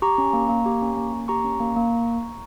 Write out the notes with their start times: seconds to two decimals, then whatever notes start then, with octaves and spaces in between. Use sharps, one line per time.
0.02 G4 A#5 C#6
0.18 C#4
0.33 A#3
0.49 A#3
0.66 G4
0.82 C#4
0.97 A#3
1.13 A#3
1.28 G4 A#5 C#6
1.44 C#4
1.60 A#3
1.76 A#3